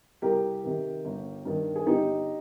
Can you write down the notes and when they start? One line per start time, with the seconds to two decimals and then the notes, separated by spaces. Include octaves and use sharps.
0.22 C2 G4 A#4
0.64 C3 D#3
1.05 G1
1.45 G2 D#3
1.75 G#4
1.86 G1 D#4 G4